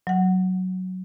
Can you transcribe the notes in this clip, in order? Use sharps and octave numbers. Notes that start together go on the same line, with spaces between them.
F#3 F#5